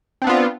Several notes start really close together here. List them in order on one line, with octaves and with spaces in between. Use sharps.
C4 D4 B3 F4